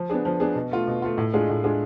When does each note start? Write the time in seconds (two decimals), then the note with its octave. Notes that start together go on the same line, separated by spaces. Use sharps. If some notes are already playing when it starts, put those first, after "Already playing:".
Already playing: F3
0.10 B3 D4 G#4
0.25 F3
0.40 B3 D4 G#4
0.55 B2
0.71 A3 F4
0.87 B2
1.02 A3 F4
1.18 A2
1.34 G#3 D4 F4 G#4
1.50 A2
1.64 G#3 D4 F4 G#4